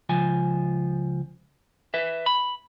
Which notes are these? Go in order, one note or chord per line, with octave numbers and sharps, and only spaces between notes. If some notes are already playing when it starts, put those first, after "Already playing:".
C#2 F3 G#5
B4 E5
B5